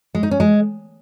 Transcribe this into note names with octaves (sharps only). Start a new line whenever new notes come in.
G#3
D#4
C#4
G#3